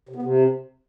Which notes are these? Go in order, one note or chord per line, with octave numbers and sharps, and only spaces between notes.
C3
B3
C3